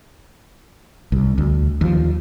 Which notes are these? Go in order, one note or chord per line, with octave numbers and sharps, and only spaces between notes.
C2
D2
D#2 F3